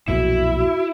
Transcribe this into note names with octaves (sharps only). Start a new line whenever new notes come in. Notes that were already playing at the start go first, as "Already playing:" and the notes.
B1 F2 A#2 E4 F#4